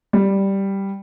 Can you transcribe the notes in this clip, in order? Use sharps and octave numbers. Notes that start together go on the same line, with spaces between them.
G3